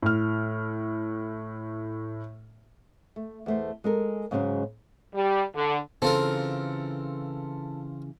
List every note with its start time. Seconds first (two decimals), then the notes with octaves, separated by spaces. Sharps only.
0.02 A2 F6
3.16 A3
3.46 E2 A3 C5
3.84 G#3 A4 A#4
4.31 G#2 C#3 F#3 G#3 B3 C#4
5.15 G3
5.55 D3
6.02 C#3 E3 C4 F4 A4 A#4